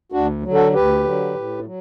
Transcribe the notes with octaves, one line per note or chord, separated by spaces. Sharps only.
D2 D4 F#4
D3 F#3
F#4 A4
D2 G4 B4
D3 F#3
A2
F#3